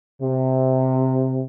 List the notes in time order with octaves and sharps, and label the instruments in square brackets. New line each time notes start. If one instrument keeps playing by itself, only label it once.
[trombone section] C3